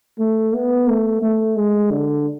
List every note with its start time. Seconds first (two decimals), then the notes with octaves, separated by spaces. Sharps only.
0.19 A3
0.54 B3
0.88 A3
1.22 A3
1.56 G#3
1.91 D3